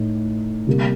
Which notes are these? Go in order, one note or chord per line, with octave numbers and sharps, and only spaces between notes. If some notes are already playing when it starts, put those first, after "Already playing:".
Already playing: A2 A3 D#4
C3 G3 A#3